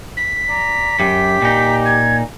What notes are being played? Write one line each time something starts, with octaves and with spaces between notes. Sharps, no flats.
B6
D5 A#5
F#2 G4
A#2 D#4
G#6